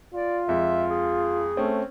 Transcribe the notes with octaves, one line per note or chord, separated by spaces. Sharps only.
F4 D5
F2 G#3 E5
G#4
A3 C4 C#4